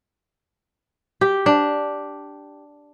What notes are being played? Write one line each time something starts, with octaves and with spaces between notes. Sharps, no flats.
G4
D4